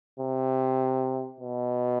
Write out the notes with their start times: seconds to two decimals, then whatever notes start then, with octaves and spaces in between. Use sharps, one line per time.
0.20 C3
1.40 B2